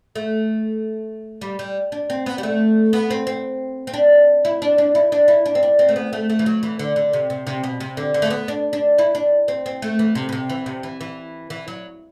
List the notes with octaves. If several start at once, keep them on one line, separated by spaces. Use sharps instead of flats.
A3
G3
G3
D4
C4
B3
G3
A3
B3
C4
C4
C4
D4
E4
D4
D4
E4
D4
E4
D4
C4
D4
C4
A3
B3
A3
A3
E3
F#3
E3
D3
D3
C3
C3
C3
B2
C3
D3
D3
A3
B3
D4
D4
E4
D4
C4
C4
A3
E3
C3
B2
C3
E3
C3
E3
E3
E3
F#3